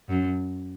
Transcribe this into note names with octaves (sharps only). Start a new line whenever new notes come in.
F#2